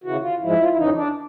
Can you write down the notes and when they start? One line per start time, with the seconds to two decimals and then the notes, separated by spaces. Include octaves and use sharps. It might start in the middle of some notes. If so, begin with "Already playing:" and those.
0.04 D#2 C#3 E3 F#4
0.22 F4
0.40 G#2 F3 G#3 E4
0.60 F4
0.69 E4
0.77 F2 C#3 E3 D#4
0.95 D4